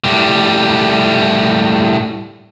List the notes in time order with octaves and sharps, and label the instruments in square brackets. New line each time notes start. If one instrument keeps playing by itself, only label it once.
[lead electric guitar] A2 G3